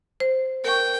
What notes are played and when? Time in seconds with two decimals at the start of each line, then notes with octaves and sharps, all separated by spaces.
0.20 C5
0.65 A#4 G5 C#6